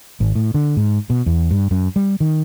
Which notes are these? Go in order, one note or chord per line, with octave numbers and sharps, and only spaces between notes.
G#1
A2
D3
G#2
B2
E2
G2
F#2
G3
D#3